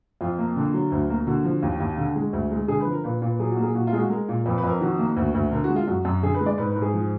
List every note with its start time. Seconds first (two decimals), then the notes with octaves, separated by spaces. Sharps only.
0.21 F2 F4
0.39 A#3
0.56 D3
0.74 F#3
0.92 D2
1.10 A#3
1.27 D3 F#4
1.45 F3
1.62 D#2
1.80 D#2
1.98 D3
2.16 G#3
2.33 D2
2.52 G#3
2.68 D3 G#4
2.80 B4
2.86 F3
2.92 A#4
3.04 A#2 B4
3.22 A#2
3.28 B4
3.39 F#3 G#4
3.51 F#4
3.57 A#3
3.63 G#4
3.75 A#2 F#4
3.87 F4
3.93 G#3 G#4
3.98 F#4
4.10 G#3 A#4
4.29 A#2
4.41 A#4
4.46 F2 B4
4.58 B4
4.64 F2
4.69 A#4
4.81 D#3 F#4
4.99 A#3
5.16 D2
5.35 D2
5.52 D3 A#4
5.64 F#4
5.69 G#3
5.76 F4
5.87 F#2 F#4
6.05 F#2
6.23 D3 G#4
6.34 B4
6.41 G#3
6.46 D5
6.58 G#2 B4
6.70 B4
6.76 G#2
6.82 G#4
6.94 F3